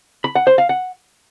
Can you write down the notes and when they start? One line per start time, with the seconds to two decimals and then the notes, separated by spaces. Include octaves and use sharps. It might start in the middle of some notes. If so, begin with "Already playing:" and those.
0.24 B5
0.35 F#5
0.47 C5
0.58 F5
0.69 F#5